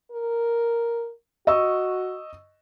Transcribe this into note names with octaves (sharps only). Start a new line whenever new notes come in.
A#4
F#4 D#5 C#6 E6